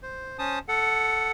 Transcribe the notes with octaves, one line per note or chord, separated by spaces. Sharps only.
C5
C#4 C5 A5 D#6
A4 F#5